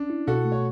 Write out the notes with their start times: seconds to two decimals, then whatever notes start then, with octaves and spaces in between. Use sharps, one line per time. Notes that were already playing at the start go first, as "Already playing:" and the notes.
Already playing: C#4 D4
0.10 E4
0.27 B2 F#4 A4
0.45 A3
0.52 C#5